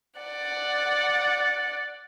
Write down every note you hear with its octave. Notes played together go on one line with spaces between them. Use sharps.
D5 F#5